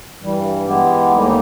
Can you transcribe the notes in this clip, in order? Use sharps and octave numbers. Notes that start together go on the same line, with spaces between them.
G2 E3 G3
E3 G#3 B3 E4 G4
D#2 D3 G3 A#3 D#4